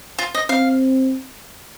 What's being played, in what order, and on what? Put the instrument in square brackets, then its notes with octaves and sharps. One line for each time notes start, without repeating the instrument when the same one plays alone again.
[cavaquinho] F4
D#5
[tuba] C4 [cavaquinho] F5